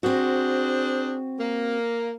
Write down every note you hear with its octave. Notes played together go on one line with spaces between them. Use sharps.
C4 D4 F#4 G#4 C5
A#3